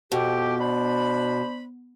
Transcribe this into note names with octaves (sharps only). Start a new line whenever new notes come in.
F2 B2 G4
D4 C5 B5